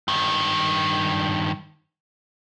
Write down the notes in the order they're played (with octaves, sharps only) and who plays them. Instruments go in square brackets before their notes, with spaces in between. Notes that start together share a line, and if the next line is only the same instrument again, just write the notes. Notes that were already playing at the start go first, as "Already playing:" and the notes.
[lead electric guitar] G2 D#3